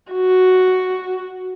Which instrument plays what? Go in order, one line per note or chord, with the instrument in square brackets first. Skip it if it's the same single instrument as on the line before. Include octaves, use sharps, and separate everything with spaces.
[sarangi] F#4